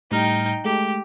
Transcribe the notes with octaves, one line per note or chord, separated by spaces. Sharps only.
A2 G3 D#4 G5 F6
G#3 A3 G4 A4